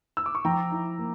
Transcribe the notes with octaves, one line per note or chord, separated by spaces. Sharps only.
E6
D6
C#6
F3 G5 A#5
E4
A#3